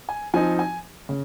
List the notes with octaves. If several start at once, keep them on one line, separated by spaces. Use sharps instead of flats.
G#5
F3 C4 D#4 G#5
G#5
C#3